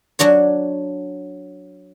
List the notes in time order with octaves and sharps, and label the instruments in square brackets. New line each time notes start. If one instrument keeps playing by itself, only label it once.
[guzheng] F#3 D4 F#4 C#5